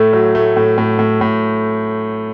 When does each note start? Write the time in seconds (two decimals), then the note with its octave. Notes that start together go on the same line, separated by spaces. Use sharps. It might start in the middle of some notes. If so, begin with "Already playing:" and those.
Already playing: A2 A3
0.13 F#3
0.35 A3
0.57 A2
0.78 A2
0.99 A2
1.21 A2